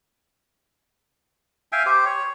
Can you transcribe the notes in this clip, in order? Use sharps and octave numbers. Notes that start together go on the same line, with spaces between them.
E5 F5 G5 G#5
G4 C5
C#5